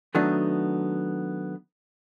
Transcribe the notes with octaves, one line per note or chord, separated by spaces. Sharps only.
D#3 F#3 A3 B3 D4 D#4